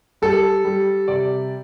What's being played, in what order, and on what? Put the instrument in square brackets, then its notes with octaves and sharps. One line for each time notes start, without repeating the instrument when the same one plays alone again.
[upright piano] G3 A4
G3
C3 D5